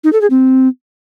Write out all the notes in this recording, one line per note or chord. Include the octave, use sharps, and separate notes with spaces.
D#4
A4
G#4
C4